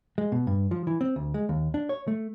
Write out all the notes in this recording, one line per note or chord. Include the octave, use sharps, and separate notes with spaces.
G#3
B2
G2
F3
E3
C4
D2
G#3
D#2
D4
C#5
A3